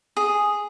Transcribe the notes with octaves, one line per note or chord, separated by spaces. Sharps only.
G#4